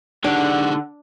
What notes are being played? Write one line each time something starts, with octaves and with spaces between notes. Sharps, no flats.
D3 D4 D#4 G4 G#4 F#5